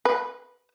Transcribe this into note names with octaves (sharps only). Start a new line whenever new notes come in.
B4